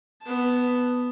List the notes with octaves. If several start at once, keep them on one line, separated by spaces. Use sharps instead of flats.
B3 A5